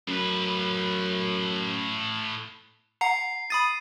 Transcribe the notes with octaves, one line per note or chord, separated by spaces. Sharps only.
F#2 A2 B4
F#5 A#5 C7
B5 D#6 A6 D#7